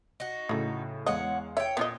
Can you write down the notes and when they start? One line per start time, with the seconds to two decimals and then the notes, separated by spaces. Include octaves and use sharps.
0.20 D#4 F#4
0.49 A2 C#3 F#3 A3
1.06 E2 G#3 C#5 D#5 F5 F#5
1.57 C#5 E5 G5
1.77 A#2 B3 F4 D#5